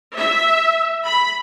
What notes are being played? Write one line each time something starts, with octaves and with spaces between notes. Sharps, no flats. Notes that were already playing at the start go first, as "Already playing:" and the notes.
E5
B5